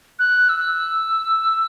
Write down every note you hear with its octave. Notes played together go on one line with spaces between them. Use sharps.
F#6
E6